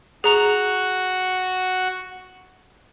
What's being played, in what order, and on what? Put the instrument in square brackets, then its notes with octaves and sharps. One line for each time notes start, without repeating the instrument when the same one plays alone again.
[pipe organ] F#4 [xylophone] G#4 A#5 F7